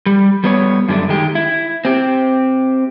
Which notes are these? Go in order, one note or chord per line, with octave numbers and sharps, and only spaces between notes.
G3
G3 B3 C#5
F#2 D3 G3 A3
D#3 G#3 G4
E4
C4 G4